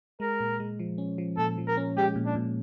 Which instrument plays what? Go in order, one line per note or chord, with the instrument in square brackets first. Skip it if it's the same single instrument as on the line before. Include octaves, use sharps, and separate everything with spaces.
[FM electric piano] G#3 [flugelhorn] A#4
[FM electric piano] A#2
G#3
F3
C#4
F3
[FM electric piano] A#2 [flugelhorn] A4
[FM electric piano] F3
[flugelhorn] A#4
[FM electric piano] C#4
[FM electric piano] G#3 [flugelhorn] G4
[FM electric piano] A#2
[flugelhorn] D4
[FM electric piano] A#2